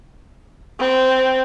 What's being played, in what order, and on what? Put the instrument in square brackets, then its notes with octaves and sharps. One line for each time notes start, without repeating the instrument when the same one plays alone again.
[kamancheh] C4